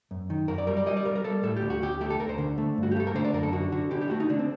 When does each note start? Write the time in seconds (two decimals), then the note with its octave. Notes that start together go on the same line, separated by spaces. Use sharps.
0.11 F#2
0.30 D#3
0.48 F#2 A#4
0.58 D5
0.67 G3 A#4
0.77 D5
0.86 G3 D#5
0.97 D5
1.05 G3 A#4
1.16 A#4
1.24 G3 A4
1.43 A2 A4
1.56 G4
1.62 D2
1.70 F#4
1.82 D2 G4
2.01 A3 G4
2.10 A4
2.19 D2 A#4
2.29 C5
2.38 D3
2.58 A3
2.78 G2
2.83 F#4
2.92 G4
2.96 A3 A4
3.07 A#4
3.15 D3 C5
3.25 D5
3.34 F#2 A#4
3.43 A4
3.53 D3 F#4
3.72 D3 F#4
3.91 D3 G4
4.01 G4
4.10 A3 F#4
4.20 D#4
4.29 D3 D4
4.39 C4